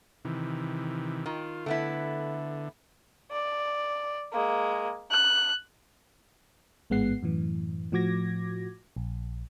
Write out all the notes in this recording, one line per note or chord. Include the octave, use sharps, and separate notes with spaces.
C3 D#3 E3
D#3 F4
D3 A3 B3 E4
D5
G#3 A#3
F#6
A1 G#2 G#3 B3 F#5 C7
F#2 A2 E3
A2 F3 F#4 D6 G#6 A#6
A#1